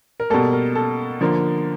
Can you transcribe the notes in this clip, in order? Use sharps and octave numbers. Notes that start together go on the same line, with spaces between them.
A#4
B2 G3 A#3 A4
A#4
A4
D3 F3 A#3